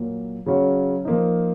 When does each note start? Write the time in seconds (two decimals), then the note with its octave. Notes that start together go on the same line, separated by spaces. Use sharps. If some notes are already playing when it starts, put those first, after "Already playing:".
Already playing: A#2 F#3 A#3
0.46 C#3 F#3 C#4 F#4
1.05 F3 A#3 D#4